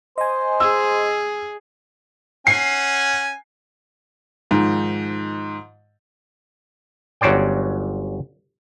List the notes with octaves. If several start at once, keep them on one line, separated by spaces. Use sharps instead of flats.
C5 D#5 G#5
G#4 E6
C#4 F#5 G#5 C7
G#2 D#3 F3
G1 F#3 C#4 C5 D5 G5